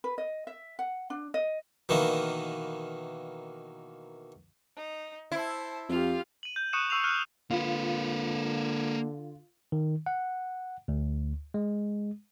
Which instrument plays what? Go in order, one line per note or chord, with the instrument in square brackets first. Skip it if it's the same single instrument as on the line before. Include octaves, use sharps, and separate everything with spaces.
[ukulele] B4
D#5
E5
F#5
D4
D#5
[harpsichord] B2 D#3 E3 A#3
[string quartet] D#4
[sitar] E4 [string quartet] C5 A5
[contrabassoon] F2 [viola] F4 G4 [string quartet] F5
[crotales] D#7 F#7
G6
C#6 D#6 F#6 C#7 D#7 E7
C#6 E6 C7 D#7 F7
F6 F#6 C#7 D#7
[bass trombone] D3 [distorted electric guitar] A#3 B4 [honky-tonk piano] F4
[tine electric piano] D#3
F#5
D2
G#3